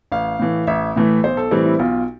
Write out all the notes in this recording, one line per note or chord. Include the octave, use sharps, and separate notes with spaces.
A1 F5
A2 E3 A3
A1 E5
A2 E3 A3
B1 C5
A4
A2 E3 G3 C4
E4
B1 F4